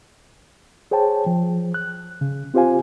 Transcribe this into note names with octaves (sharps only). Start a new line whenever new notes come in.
G#4 C5 C#5 G5 A5
F3
F#6
C#3
C4 F4 G4 C5 F5 G#5